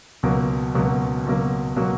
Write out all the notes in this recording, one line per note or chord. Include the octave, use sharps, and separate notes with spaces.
C#2 B2 F#3 A#3
C#2 B2 F#3 A#3
C#2 B2 F#3 A#3
B2 F#3 A#3